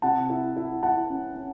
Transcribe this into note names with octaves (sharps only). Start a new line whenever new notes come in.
C3 F#5 A5
E4
E4
E4 F#5 A5
C#4
C#4